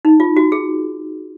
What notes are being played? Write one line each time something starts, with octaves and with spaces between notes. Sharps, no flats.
D#4
F4
F#4
G#4